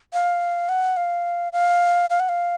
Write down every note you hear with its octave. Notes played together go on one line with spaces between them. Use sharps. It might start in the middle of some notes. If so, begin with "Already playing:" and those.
F5
F#5
F5
F5
F5
F#5
F5